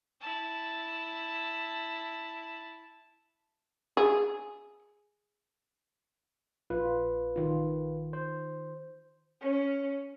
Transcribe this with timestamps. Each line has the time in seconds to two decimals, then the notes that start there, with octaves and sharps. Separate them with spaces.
0.21 E4 A5
3.97 G#4
6.70 A#1 F4 B4
7.36 D#3 F4
8.13 C5
9.41 C#4